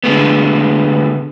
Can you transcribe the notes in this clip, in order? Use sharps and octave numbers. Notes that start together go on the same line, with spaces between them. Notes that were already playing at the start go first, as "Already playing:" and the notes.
D3 G#3 A3 B3